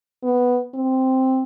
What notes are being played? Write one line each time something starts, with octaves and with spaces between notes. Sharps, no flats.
B3
C4